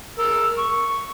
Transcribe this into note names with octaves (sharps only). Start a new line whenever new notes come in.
G#3 A#4 E6
C#6